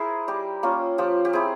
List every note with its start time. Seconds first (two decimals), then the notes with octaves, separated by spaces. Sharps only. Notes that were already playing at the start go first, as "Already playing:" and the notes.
Already playing: E4 G#4 A#4 C5
0.28 G3 G4
0.63 A#3 C#4 F4
0.98 F3 G4
1.25 G4
1.33 C4 E4 G#4